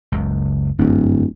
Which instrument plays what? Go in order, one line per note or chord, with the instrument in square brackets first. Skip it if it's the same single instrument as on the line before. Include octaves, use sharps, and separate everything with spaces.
[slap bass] F#1 C#2
[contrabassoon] D1 [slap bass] G1 F#2